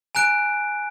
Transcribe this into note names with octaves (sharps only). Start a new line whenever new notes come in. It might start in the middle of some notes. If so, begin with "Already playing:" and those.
G#5 A#5 F#6 D7